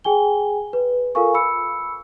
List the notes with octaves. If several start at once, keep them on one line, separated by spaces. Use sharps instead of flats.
G#4 G5 G#5 G7
B4
F4 A4 A#4 F5 G#5 C#6
B5 E6 C#7